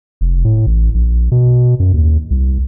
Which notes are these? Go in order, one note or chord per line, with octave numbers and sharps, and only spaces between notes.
F1
A2
A1
A#1
B2
F#2
D#2
C2